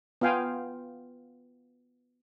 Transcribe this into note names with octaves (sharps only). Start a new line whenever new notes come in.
B3 F4 F5 G5 G#5